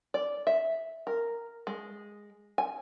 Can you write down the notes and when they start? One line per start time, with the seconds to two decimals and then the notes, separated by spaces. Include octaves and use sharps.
0.14 D5
0.47 E5
1.07 A#4
1.67 G#3
2.58 G#5